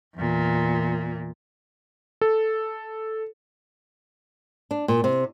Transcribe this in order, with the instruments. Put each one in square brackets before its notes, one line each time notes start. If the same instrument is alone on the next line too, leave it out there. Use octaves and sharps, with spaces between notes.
[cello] E2 A#2
[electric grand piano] A4
[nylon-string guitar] D4
A#2
C3